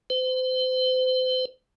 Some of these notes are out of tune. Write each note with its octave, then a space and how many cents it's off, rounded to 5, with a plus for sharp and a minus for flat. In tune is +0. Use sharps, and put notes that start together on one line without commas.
C5 -35